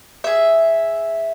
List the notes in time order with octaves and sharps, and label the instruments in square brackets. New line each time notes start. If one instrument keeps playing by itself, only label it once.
[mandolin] G#4 E5